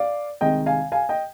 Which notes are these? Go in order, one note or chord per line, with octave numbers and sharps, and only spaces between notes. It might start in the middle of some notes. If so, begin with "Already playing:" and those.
Already playing: D5 F5
C2 C3 D#3 G#3 D#5 G5
F5 G#5
F5 G#5
D#5 G5